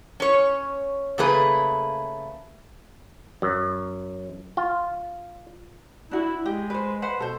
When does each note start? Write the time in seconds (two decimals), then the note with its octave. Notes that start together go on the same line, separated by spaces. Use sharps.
0.20 C#4 C#5
1.18 C#3 A3 A#3 G#4 B4
3.42 F#2
4.57 F4
6.11 D4 E4 F#4
6.46 G#3 G4
6.70 B4 C5
7.02 B4 C5 F#5
7.20 B2 A4 C5